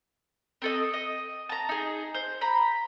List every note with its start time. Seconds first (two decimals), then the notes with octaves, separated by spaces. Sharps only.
0.62 C4 A4 D#5
0.94 D#5
1.49 A5 A#5
1.69 D#4 G#4
2.14 C5
2.41 A#5 B5